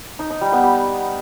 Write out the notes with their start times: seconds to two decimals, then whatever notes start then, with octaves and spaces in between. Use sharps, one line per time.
0.19 D#4
0.30 D#4
0.41 G3
0.52 B3
0.64 G4